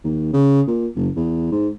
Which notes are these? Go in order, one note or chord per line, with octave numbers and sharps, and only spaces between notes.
D#2
C#3
A#2
F#1
E2
G#2